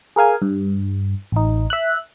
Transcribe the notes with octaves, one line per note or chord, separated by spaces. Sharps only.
G#4 A#4 F5 G#5
G2
A1 D#4
E5 F#6